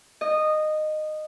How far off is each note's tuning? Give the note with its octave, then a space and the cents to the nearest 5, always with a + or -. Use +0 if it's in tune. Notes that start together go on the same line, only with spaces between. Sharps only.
D#5 -15